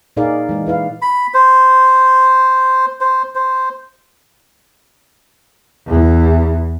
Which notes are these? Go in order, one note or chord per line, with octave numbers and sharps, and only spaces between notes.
A#2 D#4 G#4 A#4 D5 F5
E3 G#3
E4 B4 F5
B5
C5
C5
C5
E2 E3